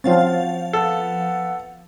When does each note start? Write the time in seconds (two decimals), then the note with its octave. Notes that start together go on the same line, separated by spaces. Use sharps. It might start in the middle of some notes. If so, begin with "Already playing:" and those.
0.04 F3 C4 C#4 F4 F#4 F5 A6
0.73 B3 A4